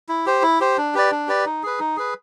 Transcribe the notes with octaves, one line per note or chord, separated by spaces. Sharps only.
E4
G4 C5
E4
G4 C5
D4
G4 B4 D5
D4
G4 B4 D5
D#4
G#4 B4
D#4
G#4 B4